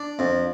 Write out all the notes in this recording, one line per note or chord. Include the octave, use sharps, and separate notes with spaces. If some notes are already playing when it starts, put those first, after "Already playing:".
Already playing: D4
F2